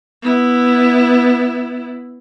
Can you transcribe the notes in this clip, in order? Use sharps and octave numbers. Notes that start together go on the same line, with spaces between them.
B3 E4